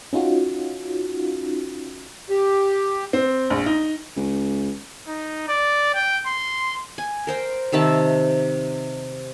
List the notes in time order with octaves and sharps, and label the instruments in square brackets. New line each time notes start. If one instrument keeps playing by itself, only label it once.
[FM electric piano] C#4 D#4 F4 F#4
[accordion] G4
[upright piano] C4
A#1
D#4
[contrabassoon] C#2
[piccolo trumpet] D#4
D5
G5
C6
[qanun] G#5
A#4 C5 G5
C3 D#3 E5 A5